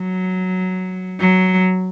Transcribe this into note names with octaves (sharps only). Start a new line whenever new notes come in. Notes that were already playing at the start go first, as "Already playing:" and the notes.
Already playing: F#3
F#3